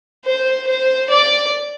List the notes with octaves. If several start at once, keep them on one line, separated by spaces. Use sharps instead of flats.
C5
C5
D5